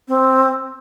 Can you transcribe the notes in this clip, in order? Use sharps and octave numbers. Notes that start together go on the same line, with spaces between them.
C4